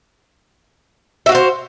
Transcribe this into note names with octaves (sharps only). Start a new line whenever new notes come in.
F#4 C5 E5 F5